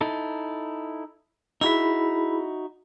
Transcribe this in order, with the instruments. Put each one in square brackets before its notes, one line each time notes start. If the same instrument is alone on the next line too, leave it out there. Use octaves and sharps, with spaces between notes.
[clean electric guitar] D#4 E4 A4
[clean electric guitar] D#4 F#4 E5 [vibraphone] E4 G#4 B5